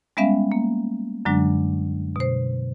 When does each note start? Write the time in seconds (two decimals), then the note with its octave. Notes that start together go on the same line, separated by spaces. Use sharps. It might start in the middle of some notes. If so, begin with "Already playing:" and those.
0.17 G3 G#3 B3 C#4 E5 F5
0.52 A#3
1.25 F#2 D3 F#3 G#3 D4
2.16 B2 C5